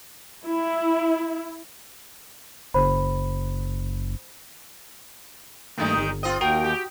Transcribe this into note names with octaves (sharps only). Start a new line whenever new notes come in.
E4
F#1 C5 B5
G2 D#3 G3 A3 A#3 D#4
G1
C4 F4 D#5
D#2 F#4 A#4 G5
G4